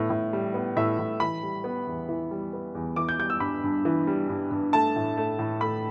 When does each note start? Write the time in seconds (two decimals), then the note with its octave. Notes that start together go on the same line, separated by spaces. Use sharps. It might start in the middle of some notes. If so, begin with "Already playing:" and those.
Already playing: A2 B3
0.10 A2
0.33 G3
0.54 B3
0.76 A2 E5
0.99 A2
1.20 E3 B5
1.43 G3
1.64 B3
1.87 E2
2.09 E3
2.31 G3
2.53 B3
2.75 E2
2.96 E3 D6
3.09 G6
3.19 G3 G6
3.30 E6
3.40 G2 B5
3.64 G2
3.85 E3
4.07 G3
4.29 G2
4.51 G2
4.73 A3 A5
4.96 A2
5.17 A3
5.39 A2
5.61 A3 B5